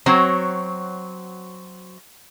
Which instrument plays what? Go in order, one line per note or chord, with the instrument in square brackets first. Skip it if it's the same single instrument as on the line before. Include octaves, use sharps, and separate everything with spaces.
[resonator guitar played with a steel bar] F#3 C4 F#4 C#5